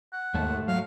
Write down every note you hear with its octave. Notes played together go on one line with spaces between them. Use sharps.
F#5
D#2 G#2 A3 A5
F#3 F5